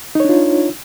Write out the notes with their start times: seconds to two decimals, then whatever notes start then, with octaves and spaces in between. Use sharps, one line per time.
0.15 D#4
0.20 C#5
0.25 D4
0.29 F4